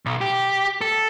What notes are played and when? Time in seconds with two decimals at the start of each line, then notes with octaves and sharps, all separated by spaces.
0.06 B1
0.21 G4
0.81 A4